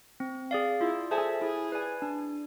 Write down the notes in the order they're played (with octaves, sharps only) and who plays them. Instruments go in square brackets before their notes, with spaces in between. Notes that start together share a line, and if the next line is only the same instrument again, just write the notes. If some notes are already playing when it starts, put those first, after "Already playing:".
[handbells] C4
G#4 D5 F5
[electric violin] E4 [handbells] F4
[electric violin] G#4 [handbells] A4 C5 E5 A5
[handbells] E4 [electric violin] G#4
[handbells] B4 D5 G#5
D4